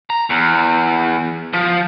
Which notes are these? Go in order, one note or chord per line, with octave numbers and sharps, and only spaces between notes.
A#5
E2
F3